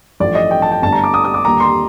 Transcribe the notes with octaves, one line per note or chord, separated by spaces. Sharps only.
A1 G2 F3 A3 D5
D#5
G5
A5
G5
G1 G2 D3 A3 A5
A#5
D6
D#6
D#6
D6
D#2 D3 G3 A#3 A#5
C6